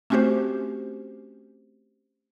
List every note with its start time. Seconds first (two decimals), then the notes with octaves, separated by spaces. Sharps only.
0.10 A3 C4 C#4 F#4 G4 C5